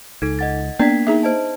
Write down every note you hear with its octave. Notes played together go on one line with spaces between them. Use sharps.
C#2 D#4 A4
D#5 F#5 A6
A#3 B3 D4 D5 G5 G#6 B6
D#4 G#4 E5
C5 D#5 A5